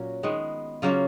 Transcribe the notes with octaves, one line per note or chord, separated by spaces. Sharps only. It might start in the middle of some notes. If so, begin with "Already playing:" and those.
Already playing: A#2 F#3 C#4 F#4
D#3 G#3 B3
C#3 F#3 A#3 C#4 F4